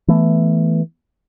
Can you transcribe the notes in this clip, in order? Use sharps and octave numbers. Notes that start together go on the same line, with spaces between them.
E3 A3 B3